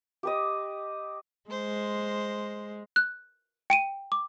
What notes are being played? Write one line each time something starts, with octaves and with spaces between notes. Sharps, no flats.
G4 B4 D#5
G#3 C5
F#6
G5 D7 D#7
D6